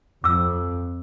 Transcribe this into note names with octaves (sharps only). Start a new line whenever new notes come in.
F2 D6 E6